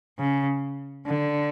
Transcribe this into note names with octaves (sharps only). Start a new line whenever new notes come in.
C#3
D3